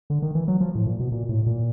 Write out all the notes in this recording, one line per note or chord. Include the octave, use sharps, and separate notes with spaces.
D3
D#3
E3
F#3
F3
A2
A#2
B2
A#2
A2
A#2